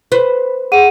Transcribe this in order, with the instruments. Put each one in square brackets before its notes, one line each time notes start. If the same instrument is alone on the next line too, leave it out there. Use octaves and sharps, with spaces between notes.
[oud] B4 C5
[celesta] G#4 F#5 D#7